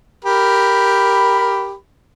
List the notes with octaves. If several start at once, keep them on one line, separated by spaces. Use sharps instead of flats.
G4 A#4 B5